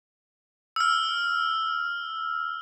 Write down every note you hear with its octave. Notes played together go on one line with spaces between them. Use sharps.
E6 F6